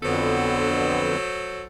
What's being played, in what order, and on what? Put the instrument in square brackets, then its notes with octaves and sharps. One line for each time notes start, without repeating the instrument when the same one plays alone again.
[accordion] F2 D3 B3 [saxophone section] F#3 A4 C5